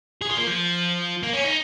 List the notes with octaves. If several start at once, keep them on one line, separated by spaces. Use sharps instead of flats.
G#4
F4
A#3
F3
A#3
C#4
D#4